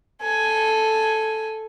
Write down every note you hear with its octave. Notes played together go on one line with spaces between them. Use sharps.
A4 G#5